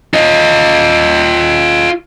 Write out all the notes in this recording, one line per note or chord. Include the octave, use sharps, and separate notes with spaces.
F4 D#5